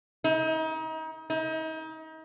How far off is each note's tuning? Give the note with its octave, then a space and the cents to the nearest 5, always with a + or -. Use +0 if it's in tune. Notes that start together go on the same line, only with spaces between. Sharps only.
D#4 +35
D#4 +35